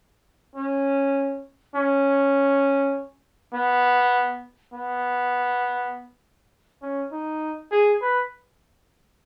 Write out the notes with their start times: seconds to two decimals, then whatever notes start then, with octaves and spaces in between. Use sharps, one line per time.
0.56 C#4
1.75 C#4
3.54 B3
4.73 B3
6.82 C#4
7.12 D#4
7.72 G#4
8.02 B4